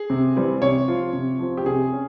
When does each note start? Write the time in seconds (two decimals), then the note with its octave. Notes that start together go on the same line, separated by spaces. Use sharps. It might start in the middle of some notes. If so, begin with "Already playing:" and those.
Already playing: G#4
0.10 C3
0.35 E3 G3 C4 E4
0.62 C3 C#5
0.87 F3 C4 F4
1.13 C3
1.39 F3 C4 F4
1.57 G4
1.66 C3 G#4
1.92 C#4